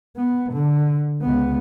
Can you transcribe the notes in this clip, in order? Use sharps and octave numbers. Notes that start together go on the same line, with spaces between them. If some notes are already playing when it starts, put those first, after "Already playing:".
B3
D3
C#2 B3